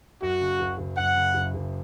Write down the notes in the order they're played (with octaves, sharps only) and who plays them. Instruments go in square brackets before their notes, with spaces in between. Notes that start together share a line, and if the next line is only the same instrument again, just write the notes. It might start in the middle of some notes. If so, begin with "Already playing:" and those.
[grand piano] F#2 [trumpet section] F#4
[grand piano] C#3
F#1
F#1
[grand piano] F#2 [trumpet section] F#5
[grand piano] C#3
F#1
F#1